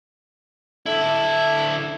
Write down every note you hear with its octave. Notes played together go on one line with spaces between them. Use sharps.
D3 E4 A4